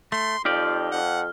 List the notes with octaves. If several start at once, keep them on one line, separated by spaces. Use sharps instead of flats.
A3 C6
F2 D#4 F4 G4 D5 F6
F2 F#5